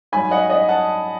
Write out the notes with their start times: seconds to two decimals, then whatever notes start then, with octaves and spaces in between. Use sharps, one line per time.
0.12 G#2 F#3 G#5 B5
0.31 D#5 F#5
0.49 D#5 F#5
0.69 F#5 A5